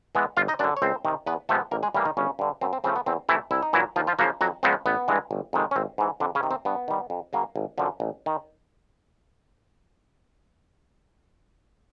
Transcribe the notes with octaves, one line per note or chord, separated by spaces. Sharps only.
E3 G#3 B3
G1 F4 F5
D#4 D#5
F#2 D3 D4 D5
C#5
C#2 C4 C5
C3 D#3
E2 B3 B4
C3 F3 G#3 A3 B3 A4
A1 A#3 A#4
G#3 G#4
A2 E3 G3 A#3 G4
D#3 D#4
G1 C#3 C#4
G2 D3
F#2 C4
C4
C#3 F3 A3 C4
B3
E2 C4
C3 E3 A3 E4
C2 E4
D#4
A#2 E3 F#3 E4
D#2 F3 F4
F3 F4
C#3 F3 F#3 A#3 F#4
F2 F#3 F#4
C#3 F3 G#3 B3 C4
A1 B3
G2 E3 G#3
G1
F2 C3 D#3 G#3
C#4
G#1 C4
G#2 E3
F2 D3 D4
C#3 C#4
C3 D#3
C4
G2 B3
D#3 G3
F2
C#3 F#3 A#3
G#1
F#2 D3 F3
A1
D#3